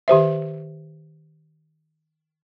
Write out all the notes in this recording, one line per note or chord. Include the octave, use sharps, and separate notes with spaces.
D#3 G4 C5 E5